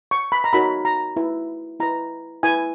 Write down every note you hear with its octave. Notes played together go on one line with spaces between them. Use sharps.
C#6
B5
A#5
D#4 F#4 A#4 C#5 B5
A#5
E4 B4
E4 B4 A#5
E4 B4 G#5